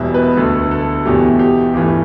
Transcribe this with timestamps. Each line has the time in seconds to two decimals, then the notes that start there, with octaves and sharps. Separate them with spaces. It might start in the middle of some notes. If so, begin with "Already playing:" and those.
Already playing: E1 E2 B2 G3 E5
0.14 B4
0.37 D2 D3 A3 A4
0.71 A4
1.05 E2 B2 A3 G4
1.39 G4
1.74 G1 G2 E3 A3 G4